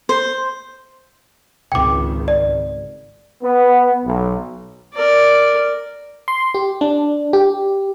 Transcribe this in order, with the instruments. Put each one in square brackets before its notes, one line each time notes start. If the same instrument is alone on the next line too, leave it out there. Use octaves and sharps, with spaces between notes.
[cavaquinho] C5
[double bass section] G#1 C#2 D#3 [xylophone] G5 D6
[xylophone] D5
[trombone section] B3
B1
[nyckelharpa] A#4 D5
[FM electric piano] C6
G4
D4
G4